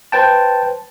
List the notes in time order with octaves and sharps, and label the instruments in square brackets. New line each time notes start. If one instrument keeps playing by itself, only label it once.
[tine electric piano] B4 C5 G5 A5